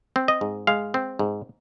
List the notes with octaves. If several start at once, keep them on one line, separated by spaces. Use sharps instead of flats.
C4
D#5
G#2
G#3 F5
C4
G#2